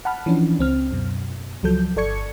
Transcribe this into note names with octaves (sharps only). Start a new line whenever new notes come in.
F#5 A5 B5 F6
E3 F3 C#4 D4
C#2 C4 F6
F#2 B2
C#2 F3 F#3 A4 G6
G1 A4 D5 C#6 G#6 C#7